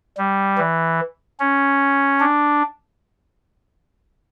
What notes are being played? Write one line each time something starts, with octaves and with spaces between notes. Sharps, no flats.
G3
E3
C#4
D4